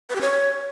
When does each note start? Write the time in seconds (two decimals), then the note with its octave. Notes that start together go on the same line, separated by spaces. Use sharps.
0.10 B4
0.15 G4
0.21 C#5